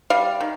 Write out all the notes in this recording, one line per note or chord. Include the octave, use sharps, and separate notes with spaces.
G3 F5
D#3